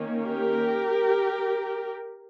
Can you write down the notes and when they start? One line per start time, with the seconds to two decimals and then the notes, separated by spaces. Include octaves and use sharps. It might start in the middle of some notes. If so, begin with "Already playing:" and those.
Already playing: D#3 A#3 C#4
0.24 G4 A#4